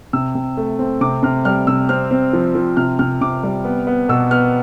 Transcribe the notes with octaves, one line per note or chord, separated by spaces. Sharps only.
C3 E6
C3
A3
C4
C3 D6
C3 F6
G3 F6
C3 E6
C4 F6
C4
F3
F3
C3 F6
C3 F6
C3 D6
G3
B3
B3
B2 E6
B3 F6